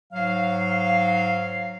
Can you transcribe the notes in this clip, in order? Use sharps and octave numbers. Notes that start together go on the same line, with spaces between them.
G#2 F#3 F5